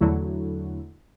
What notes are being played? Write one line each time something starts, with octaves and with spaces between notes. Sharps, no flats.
E2 D3 F#3 A3 E4 F#4